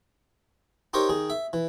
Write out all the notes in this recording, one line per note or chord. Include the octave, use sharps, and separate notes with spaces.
D#4 G4 A#4 C5 C#5
D#3 G#4
E5
E3